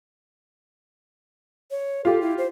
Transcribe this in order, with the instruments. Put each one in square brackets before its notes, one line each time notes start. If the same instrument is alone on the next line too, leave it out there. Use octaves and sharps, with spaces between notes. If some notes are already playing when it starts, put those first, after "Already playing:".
[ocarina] C#5
[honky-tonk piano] F4 G4 [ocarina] A4
[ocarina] E4
C5